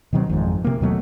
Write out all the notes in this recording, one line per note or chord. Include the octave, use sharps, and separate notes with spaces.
B2 D#3 F#3 C4
G#1 F2 G#2
C3 A#3
D#2 B2 F#3 A3